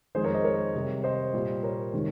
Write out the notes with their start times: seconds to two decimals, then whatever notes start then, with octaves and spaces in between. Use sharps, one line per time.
0.15 F2 D#3 G#3 G#4 C5
0.24 A#4 C#5
0.34 C5 D#5
0.44 A#4 C#5
0.75 C3 G3
1.04 C5 D#5
1.34 A#2 G3
1.63 A#4 C#5
1.93 C3 D#3 G#3